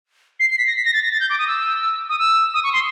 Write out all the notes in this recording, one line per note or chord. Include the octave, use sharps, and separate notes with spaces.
C7
C7
B6
A#6
B6
A#6
A6
A#6
A6
G6
D6
D#6
E6
D#6
E6
D#6
C#6
C6